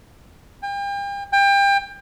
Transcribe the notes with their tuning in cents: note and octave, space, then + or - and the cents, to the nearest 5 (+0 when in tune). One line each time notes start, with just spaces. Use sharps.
G5 +40
G5 +30